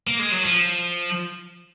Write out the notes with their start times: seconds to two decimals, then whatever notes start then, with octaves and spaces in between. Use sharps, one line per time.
0.07 A#3
0.19 G#3
0.32 F#3
0.45 F3